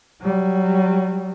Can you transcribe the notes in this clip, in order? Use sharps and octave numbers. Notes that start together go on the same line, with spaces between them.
F#3 G3